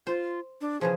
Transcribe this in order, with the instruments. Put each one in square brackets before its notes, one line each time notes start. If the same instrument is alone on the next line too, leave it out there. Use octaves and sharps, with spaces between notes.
[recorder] F4 [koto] C5
[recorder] D4
[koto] C#3 E3 F3 [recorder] G#4